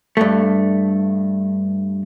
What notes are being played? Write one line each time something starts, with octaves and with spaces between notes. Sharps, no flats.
G2 A3